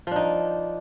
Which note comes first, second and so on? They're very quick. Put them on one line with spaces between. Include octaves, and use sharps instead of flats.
F3 D4 D#4